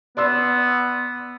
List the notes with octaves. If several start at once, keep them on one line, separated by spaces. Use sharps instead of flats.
B3 D5 C6 E6